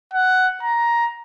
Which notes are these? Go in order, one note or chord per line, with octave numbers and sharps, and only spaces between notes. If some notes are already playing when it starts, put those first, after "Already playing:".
F#5
A#5